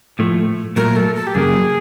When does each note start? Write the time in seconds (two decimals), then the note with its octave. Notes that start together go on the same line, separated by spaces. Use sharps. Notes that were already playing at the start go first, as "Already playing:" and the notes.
0.19 A2 F3 A3
0.76 A#2 F#3 A3 A#4
0.96 A4
1.15 A4
1.27 G4
1.35 F#2 C#3 F#3 A#3 G#4